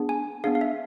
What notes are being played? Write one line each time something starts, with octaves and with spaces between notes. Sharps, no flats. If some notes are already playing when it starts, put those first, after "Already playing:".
Already playing: B3 D4 G#4
G#5
B3 D4 G#4 F5
F5
E5